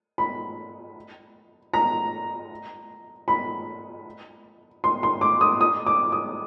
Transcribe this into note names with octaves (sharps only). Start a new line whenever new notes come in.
B5
A#5
B5
C6
C6
D6
D#6
D#6
D6
D#6